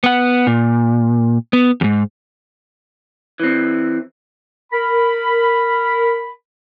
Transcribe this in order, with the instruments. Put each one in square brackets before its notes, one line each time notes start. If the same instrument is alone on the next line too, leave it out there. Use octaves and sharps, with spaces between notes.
[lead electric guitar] B3 F#5
A#2
B3
E2 G#2
[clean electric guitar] E3 C4
[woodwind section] A#4 B5